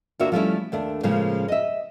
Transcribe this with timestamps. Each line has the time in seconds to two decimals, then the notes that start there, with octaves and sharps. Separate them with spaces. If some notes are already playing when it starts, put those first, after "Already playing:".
0.19 D2 A#3 D4 F#4 E5
0.32 F3 G3 A3 B3 C#4 E4
0.72 D#2 A3 D4
1.03 A2 C#3 F3 G#3 A#3
1.48 D#5 E5